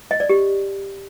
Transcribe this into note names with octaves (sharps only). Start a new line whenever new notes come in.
D#5
D5
G4